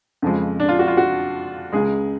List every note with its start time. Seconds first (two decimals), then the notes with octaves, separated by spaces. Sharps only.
0.22 F2 C#3 F3 G#3
0.60 D4
0.69 F4
0.79 F#4
0.88 F4
0.97 F#4
1.73 C#2 C#3 G#3 G#4